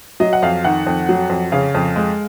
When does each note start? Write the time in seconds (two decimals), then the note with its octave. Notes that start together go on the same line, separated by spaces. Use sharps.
0.20 F#3 D#5
0.33 F#5
0.42 F2 F5
0.65 D#3 F#5
0.86 F2
1.09 F#3
1.30 F2
1.52 C#3 F5
1.75 F2
1.96 G#3